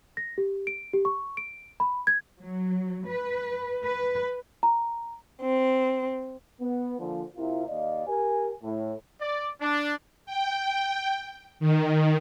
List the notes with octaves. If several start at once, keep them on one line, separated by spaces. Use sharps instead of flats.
A#6
G4
D7
G4
C#6
D7
B5
G#6
F#3
B4
B4
A#5
C4
B3
A#2 D3 F3
C3 A#3 E4 F4
D#2 D5 D#5 F5
G4 A#4 G#5
A2
D5
D4
G5
D#3